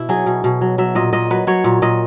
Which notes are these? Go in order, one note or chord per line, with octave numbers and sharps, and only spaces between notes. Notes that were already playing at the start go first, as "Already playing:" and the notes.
Already playing: B2 E4
F#3 G#4
B2
B2
F#3
F#3 E5
A#2 D#5
A#2 D#5
F#3 B4
F#3 C#5
A#2
A#2 D#5